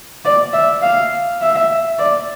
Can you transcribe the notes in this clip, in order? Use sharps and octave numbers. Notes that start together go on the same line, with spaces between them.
D5
E5
F5
E5
D5